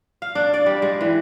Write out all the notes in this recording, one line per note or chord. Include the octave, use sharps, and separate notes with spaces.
F5
D4
D5
G3
G#3
E3